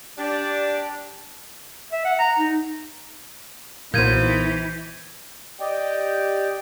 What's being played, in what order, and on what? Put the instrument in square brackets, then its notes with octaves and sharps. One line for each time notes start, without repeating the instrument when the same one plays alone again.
[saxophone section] D4 [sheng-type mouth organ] G4 D5
[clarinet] E5
F#5
A#5
D#4
[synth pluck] B1 A#2 [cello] E3 [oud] D#4 C5 [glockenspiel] G6 G#6 D#7
[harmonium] G4 D5 D#5 G5